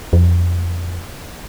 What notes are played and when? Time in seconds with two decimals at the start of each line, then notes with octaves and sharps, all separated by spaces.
0.13 F2